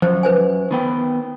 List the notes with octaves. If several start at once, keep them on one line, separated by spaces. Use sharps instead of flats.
F#2 F3 C5
B4 C5 G#5
D#3 B3 G5